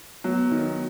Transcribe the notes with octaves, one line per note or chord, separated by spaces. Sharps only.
F#3 B3
D#3